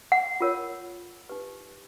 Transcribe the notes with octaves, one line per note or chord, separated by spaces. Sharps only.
F#5
F4 A#4 C#5
D#4 G4 B4